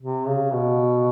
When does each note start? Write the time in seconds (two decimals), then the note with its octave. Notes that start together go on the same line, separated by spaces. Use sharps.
0.01 C3
0.27 C#3
0.53 B2